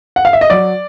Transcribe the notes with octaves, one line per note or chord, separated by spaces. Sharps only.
F#5
F5
E5
D#5
F#3 D5